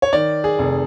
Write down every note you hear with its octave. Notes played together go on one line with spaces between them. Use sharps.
C#5
D#3 D5
G#4
F1